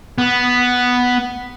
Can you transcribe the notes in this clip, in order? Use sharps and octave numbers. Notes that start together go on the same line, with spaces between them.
B3